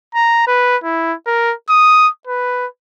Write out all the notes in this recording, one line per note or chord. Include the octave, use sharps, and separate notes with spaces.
A#5
B4
E4
A#4
D#6
B4